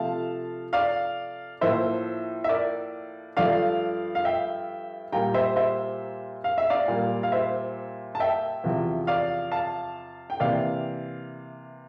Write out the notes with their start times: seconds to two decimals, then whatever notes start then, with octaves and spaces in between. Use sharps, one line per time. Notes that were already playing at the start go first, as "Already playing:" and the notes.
Already playing: C3 F3 A3 F5 A5
0.73 D5 F5
1.61 A2 F3 A#3 C5 E5
2.44 E5
2.49 A#4 D5
3.37 G2 F3 A3 D5 F5
4.15 F5
4.25 E5 G5
5.12 A#2 G3 A#3 G5 A#5
5.34 C5 E5
5.56 C5 E5
6.44 F5
6.58 E5
6.70 D5 F5
6.88 A#2 G3 A#3
7.23 F5
7.32 C5 E5
8.15 A5
8.20 E5 G5
8.64 E2 C3 F3
9.07 D5 F5
9.51 F5 A5
10.30 G5
10.39 C3 E3 A#3 D5 F5